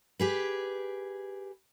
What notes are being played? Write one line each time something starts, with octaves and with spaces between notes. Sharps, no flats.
G4 G#4 B4